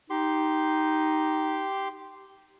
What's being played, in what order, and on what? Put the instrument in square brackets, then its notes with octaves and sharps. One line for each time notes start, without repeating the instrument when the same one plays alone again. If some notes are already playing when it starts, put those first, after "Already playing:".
[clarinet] D#4 [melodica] G4 C6